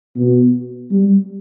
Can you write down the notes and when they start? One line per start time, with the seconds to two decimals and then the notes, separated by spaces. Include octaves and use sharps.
0.16 B2
0.91 G3